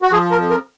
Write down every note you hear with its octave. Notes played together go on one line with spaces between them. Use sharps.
F#4
F3 G#4
A#4
F2
A#4